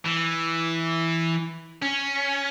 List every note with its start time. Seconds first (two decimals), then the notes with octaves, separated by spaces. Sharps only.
0.05 E3
1.82 C#4